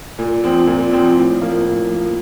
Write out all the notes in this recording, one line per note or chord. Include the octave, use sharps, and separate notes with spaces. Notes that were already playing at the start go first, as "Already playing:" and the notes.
A#2
F3 C4
A#2
F3 C4
A2
F3 A#3
A2
F3 A#3